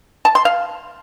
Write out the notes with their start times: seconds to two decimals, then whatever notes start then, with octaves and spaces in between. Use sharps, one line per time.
0.25 A5
0.35 C6
0.45 F5